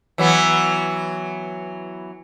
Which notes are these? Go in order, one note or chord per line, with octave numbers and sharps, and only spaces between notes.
E3 F#3 B3